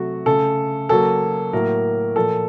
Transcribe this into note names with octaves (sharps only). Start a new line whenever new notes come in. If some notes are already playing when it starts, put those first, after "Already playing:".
Already playing: C3 F#3 A3 F#4
C#3 A3 A4
C#3 F#3 A#3 A4
A2 F#3 A#3 A#4
A#2 F3 A#3 A4